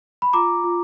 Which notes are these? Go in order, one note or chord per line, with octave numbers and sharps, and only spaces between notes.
B5
F4 A#5 D6
F4